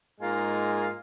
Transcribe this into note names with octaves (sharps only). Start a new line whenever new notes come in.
G#2 G#3 A#3 F4 G#5